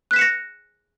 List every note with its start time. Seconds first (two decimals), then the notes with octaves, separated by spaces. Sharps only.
0.11 F#6
0.13 B6
0.16 E7
0.19 C#7
0.21 A#6